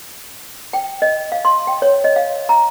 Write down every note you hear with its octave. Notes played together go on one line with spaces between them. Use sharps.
G5
D#5
F5
C6
G5
C#5
D#5
F5
A#5